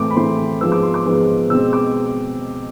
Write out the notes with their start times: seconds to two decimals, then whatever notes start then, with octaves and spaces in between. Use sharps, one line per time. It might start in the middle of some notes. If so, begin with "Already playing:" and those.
Already playing: A2 E3 A3 C4 D6
0.11 B5
0.16 A2 E3 A3 C4 C6
0.61 G#2 F3 G#3 B3 E6
0.72 D6
0.83 C6
0.94 D6
1.06 G#2 F3 G#3 B3
1.50 B2 G#3 C4 E6
1.73 D6